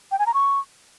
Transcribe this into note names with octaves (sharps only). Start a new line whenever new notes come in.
G5
G#5
A#5
C#6